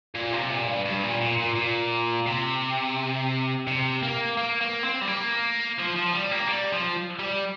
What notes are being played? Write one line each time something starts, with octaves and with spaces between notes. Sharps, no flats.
A#2
C3
A#2
G2
G2
A#2
A#2
A#2
A#2
C3
C3
A#3
A#3
A#3
C4
G3
A#3
F3
F3
G3
A#3
G3
F3
G3